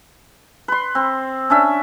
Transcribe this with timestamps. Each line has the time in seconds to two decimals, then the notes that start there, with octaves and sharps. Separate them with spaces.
0.68 B4 C6
0.95 C4
1.50 C#4 D4 E5